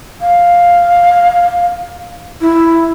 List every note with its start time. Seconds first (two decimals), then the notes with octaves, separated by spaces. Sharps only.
0.21 F5
2.41 E4